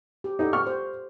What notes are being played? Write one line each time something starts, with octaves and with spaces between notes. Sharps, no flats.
G4
D#4 G4 A4 F#5
C#6 F6
G4 C5